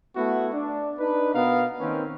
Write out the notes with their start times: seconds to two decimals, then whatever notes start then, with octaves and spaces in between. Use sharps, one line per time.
0.16 A3 B3 E4 F#4
0.53 D4
0.99 D4 D#4 B4
1.34 B2 B3 A#4 F5
1.79 D#3 A#3 C4 C#4 B4